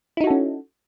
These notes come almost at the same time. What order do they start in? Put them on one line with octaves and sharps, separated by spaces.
E4 D#4 F#4 A4 C#4